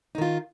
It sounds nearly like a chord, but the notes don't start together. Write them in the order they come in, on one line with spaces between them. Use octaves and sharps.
D#4 D#3 F4